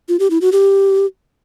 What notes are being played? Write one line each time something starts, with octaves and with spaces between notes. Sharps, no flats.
F4
G4
E4
F#4
G4